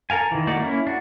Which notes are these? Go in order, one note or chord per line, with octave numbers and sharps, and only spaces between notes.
A4 A#4 F5 G#5
D#3 E3
A3 A#3 D#4 F#4 D5
A#3 C#4 E4
D4 F#4